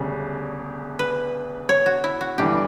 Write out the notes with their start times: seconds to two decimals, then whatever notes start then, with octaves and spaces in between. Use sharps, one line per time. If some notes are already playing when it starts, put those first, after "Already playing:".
Already playing: E1 D2 C#3 G3
0.99 B4
1.69 C#5
1.86 F#4
2.04 E4
2.21 F#4
2.38 G1 G2 E3 G4